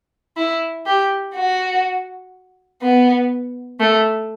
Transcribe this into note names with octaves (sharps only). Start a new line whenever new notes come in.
E4
G4
F#4
B3
A3